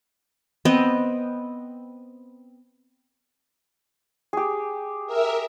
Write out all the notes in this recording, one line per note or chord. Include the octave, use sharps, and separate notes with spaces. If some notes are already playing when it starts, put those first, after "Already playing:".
B3 C4 D#5
G4 G#4
A#4 E5